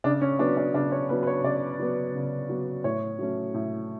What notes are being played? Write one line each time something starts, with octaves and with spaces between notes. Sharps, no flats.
C#3 D4
C#4
F#3 B3 D4
D4
C#3 D4
C#5
F#3 B3 B4
B4
C#5
C#3 D5
F#3 B3
C#3
F#3 B3
A2 C#5
F#3 A3 C#4
A2